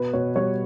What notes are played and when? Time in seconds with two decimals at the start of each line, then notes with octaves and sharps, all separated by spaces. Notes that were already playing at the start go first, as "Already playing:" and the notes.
Already playing: B2 B4
0.13 B2 C#5
0.36 G3 C#5